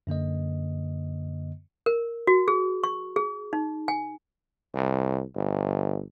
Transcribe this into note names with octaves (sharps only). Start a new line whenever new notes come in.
F#2 D3 A#3 D#5
A#4
F#4
G#4
C#6
G#4
D#4
G#5
C2
G1